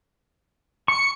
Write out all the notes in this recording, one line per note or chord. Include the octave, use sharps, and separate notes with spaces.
C#6 C#7